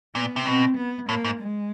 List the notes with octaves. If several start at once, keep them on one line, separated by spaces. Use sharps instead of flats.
A#2 B3
C3
B2 C4
B3
A2 A#3
G#2
G#3